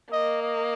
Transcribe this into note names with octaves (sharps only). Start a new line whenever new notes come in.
A#3 D#5
D#5